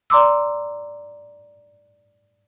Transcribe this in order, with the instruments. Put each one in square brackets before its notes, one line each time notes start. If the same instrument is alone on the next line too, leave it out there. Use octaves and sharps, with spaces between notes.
[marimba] D5 A#5 C6 D6 E6